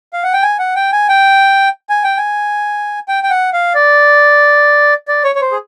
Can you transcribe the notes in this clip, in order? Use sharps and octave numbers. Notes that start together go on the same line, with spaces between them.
F5
F#5
G5
G#5
F#5
G5
G#5
G5
G#5
G5
G#5
G5
G5
F#5
F5
D5
D5
C#5
C#5
C5
G#4